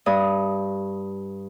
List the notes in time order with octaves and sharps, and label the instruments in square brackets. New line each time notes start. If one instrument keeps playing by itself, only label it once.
[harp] G2 D#6